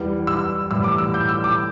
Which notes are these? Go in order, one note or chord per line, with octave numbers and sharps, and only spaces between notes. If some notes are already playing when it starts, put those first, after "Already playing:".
Already playing: E2 E3 G3
E6
A2 E3 G3 E6
D6
E6
G6
E6
D6